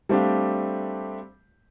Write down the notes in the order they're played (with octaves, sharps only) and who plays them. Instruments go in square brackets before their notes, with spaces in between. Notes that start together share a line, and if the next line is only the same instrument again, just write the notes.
[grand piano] G3 A3 C4 D4 G4 F5